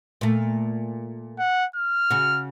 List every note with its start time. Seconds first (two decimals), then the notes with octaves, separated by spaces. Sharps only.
0.21 A#2 A3
1.39 F#5
1.76 F6
2.10 C#3 F#4